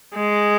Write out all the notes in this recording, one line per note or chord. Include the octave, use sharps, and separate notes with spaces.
G#3